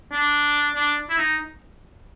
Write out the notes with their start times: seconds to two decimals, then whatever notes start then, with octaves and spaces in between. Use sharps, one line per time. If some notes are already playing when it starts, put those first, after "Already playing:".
0.12 D4
0.75 D4
1.10 E4
1.18 D#4